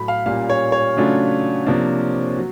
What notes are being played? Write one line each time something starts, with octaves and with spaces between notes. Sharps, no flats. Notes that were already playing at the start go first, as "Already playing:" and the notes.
Already playing: A2 F#3 A3 B5
F5
A#2 G3 A#3 C#4 F5
C#5
C#5
C#3 F#3 A3 D4 F4
C3 F3 A#3 D4
F#3